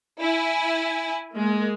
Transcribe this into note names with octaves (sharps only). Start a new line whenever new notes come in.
E4 G#5
G#3 A#3